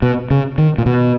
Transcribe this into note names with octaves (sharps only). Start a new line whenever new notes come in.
B2
C#3
D#3
A#2
B2